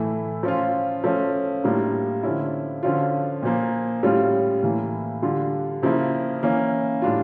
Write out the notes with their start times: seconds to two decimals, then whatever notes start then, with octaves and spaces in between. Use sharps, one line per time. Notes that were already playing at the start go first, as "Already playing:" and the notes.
Already playing: A2 E3 A3 E4
0.43 F3 C#4 F4
1.04 F3 A3 C#4
1.64 A2 G3 A#3 D4 F4
2.23 D3 F3 C#4 E4
2.83 D3 F3 C#4 F4
3.43 A#2 F3 A#3
4.03 A2 G3 C#4 F4
4.63 A2 E3 A#3
5.22 D3 G3 D4 F4
5.82 C#3 F3 A#3 E4
6.43 E3 A#3 C#4
7.02 A2 G3 D4 F4